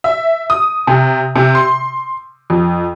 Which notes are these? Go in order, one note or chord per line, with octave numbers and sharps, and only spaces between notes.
E5
D#6
C3
C3
C6
F2